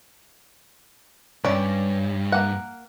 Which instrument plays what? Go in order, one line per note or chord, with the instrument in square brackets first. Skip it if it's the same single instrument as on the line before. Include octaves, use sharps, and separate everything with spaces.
[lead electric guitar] C#2 G2 [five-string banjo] C#4 D5
[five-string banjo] A#3 F#5